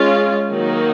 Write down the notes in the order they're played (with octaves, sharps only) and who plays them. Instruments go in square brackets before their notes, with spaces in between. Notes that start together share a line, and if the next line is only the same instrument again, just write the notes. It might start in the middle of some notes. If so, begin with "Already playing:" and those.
Already playing: [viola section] G#3 C#4 F4
D#3 F#3 A#3 D#4